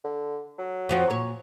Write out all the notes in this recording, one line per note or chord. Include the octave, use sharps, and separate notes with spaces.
D3
F#3
F2 F3 F#4
A#2 C#5